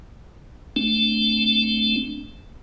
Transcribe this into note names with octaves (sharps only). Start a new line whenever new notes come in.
A3 C4 D4